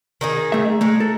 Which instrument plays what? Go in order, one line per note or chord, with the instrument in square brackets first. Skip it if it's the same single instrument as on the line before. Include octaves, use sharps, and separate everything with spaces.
[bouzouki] D#3 D#4 G#4
[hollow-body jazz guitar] A3 E5
[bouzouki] G#3 D#4 [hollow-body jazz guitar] A3
[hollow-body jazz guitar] A4